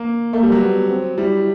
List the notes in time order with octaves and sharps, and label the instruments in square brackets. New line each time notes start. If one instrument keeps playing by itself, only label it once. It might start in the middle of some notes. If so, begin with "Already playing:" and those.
Already playing: [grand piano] A#3
[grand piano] A3 [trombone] A#3
[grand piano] G3
F#3
[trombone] B3
C4
[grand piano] G3 [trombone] E4